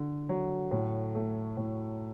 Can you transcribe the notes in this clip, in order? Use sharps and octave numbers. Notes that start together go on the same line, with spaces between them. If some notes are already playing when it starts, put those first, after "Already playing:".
Already playing: D3
F#3
A2
A3
A2